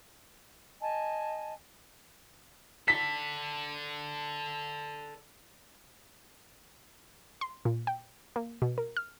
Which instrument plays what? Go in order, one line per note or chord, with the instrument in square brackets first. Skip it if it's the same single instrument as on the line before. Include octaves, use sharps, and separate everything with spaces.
[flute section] D#5 G#5 A5
[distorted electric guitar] A4 D5 [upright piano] B6
[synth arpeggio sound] C6
A#2
G5
A#3
B2
A#4
F6